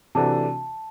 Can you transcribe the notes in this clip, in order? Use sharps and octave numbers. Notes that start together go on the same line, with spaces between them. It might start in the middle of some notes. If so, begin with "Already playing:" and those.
C3 E3 A3 D4 F#4 A5